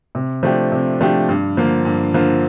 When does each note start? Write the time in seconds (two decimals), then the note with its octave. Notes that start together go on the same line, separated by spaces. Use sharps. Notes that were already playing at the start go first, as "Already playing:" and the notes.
0.15 C3
0.43 F3 A3 D4 G4
0.72 C3
1.01 F3 A3 D4 G4
1.29 G2
1.57 D3 F3 A#3
1.85 G2
2.14 D3 F3 A#3